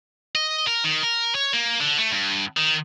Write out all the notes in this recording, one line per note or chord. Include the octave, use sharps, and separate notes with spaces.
D#5
A#4
D#3
A#4
C#5
A#3
D3
A3
G2
D#3